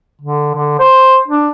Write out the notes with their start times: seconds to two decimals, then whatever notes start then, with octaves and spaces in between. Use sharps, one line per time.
0.22 D3
0.55 D3
0.79 C5
1.28 D4